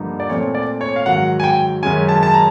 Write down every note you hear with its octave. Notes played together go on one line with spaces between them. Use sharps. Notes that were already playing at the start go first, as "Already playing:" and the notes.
Already playing: G2 D3 F3 A#3 D#4
D5
A#2 F3 A3 C4 C#5
D5
C#5
F5
G#2 D#3 F#3 F#5
G#5
G5
F#2 D#3 G#3 C#4 G#5
A5
A5
A#5